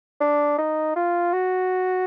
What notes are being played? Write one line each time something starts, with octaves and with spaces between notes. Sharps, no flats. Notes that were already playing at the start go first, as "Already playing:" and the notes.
D4
D#4
F4
F#4